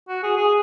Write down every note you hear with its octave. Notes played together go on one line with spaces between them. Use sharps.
F#4
G#4
G#4